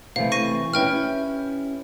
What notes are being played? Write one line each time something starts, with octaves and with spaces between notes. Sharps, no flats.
C3 E3 A3 F5
C#6 A#6 D#7
C#4 E4 G4 B4 G5 F6